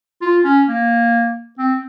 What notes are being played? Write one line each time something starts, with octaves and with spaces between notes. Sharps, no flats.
F4
C#4
A#3
C4